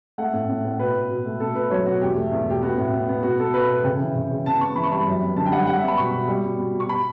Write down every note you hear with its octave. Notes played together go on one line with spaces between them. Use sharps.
A3 F#5
A2
A2
A2
B2 B4
B2
B2
A3
B2 A4
B2 B4
F#3 C#5
B2 F#4
E2 G4
A3
E2
B2 G4
B3 F#4
A2
B3
B3
B2 F#4
B3 A4
B2 B4
B2 B4
C#3 G5
E3
C#3
C#3
B3 A5
B3 C#6
E3 B5
C#6
G3 B5
F#2
B3
D3 A5
G5
G3 F#5
G3 F#5
E5
B3
B5
B2 C#6
B2
G3
B2
B2
B2
C#6
B5